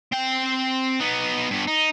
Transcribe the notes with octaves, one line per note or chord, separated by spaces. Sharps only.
C4 G5
B3 D#4
G2 B3
D#4